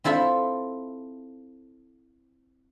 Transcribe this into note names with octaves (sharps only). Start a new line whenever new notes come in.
C4 E4 F4 A4 E5